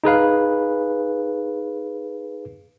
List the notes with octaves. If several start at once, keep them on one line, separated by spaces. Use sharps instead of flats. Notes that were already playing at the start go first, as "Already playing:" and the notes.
D#4 G#4 B4 F5